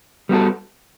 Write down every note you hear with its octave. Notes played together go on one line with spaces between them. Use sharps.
G3 B3 F#4 A4